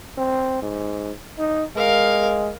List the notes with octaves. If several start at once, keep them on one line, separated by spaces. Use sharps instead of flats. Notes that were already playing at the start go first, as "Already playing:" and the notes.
C4
G#2
D#4
G#3 A#4 F5